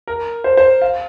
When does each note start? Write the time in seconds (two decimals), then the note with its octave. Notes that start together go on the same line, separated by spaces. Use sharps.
0.08 A#4
0.44 C5
0.57 C5
0.82 F5